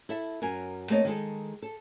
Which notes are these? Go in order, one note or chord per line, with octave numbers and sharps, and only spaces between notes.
E4 A4 E5
F#2 A#4 G#5
A3 A#3 C4 C#5 D#5
D#3 G#3 A4
A4